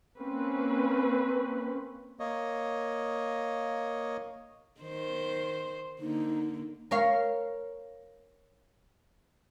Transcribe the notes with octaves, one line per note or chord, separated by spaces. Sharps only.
A#3 C4 C#4 B4
A#3 C#5 D#5
D#3 C5
D3 A#3 D#4
A#4 C#5 F5